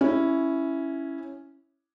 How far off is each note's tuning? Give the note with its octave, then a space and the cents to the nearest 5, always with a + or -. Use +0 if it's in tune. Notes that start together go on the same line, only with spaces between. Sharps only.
C#4 +0 E4 +0